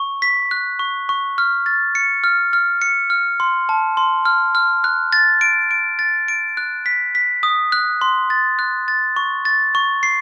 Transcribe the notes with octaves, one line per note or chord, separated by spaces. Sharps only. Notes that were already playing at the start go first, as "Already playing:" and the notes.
Already playing: C#6
B6
F#6
C#6
C#6
F6
A6
C#7
F6
F6
C#7
F6
C6
A5
C6
F6
F6
F#6
A6
D7
D7
A6
D7
F#6
B6
B6
D#6
F#6
C6
A6
F#6
A6
C#6
A6
C#6
C7